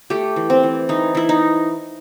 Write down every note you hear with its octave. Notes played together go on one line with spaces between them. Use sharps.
A3 G4
E3
C4
E3
E3 D#4
E3 E4
D#4